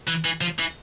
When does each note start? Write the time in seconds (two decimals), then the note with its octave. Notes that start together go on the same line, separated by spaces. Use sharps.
0.07 E3
0.25 E3
0.41 F3
0.59 E3